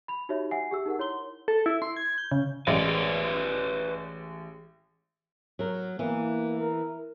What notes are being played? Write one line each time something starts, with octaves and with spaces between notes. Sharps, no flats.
B5 F7
D#4 F#4 G4 C#5 E5
E5 F#5 G#5 C7
G4 G#4 E6
D#4 A#4 F#5
E4 C#5 C6 G7
A4
E4
C6
G#6
G6
C#3
A1 G#3 B4 C#5 D5
F#3 A#4
E3 A#3 B3
A#4